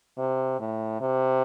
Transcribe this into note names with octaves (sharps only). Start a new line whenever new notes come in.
C3
A2
C3